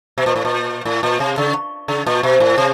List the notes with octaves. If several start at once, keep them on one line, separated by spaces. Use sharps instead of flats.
B2
A#2
A2
A#2
A2
A#2
C3
C#3
C#3
A#2
B2
A2
C3